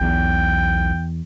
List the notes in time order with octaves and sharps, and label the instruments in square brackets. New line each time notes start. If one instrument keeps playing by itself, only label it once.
[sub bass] B1 [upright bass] E2 [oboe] G5